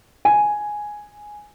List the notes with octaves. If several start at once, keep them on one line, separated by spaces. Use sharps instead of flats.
G#5